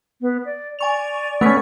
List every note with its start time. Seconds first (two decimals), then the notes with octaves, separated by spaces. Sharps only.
0.21 B3
0.45 D5
0.79 D5 G#5 C#6 F7
1.41 A3 B3 C#4 C#6 B6